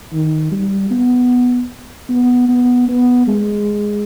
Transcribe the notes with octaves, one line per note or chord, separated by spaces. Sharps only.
D#3
G3
B3
B3
B3
B3
G#3